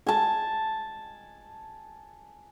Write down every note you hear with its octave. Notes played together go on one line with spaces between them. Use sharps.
G#5 A5